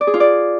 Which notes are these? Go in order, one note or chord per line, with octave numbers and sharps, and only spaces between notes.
D5
G#4
F4
D5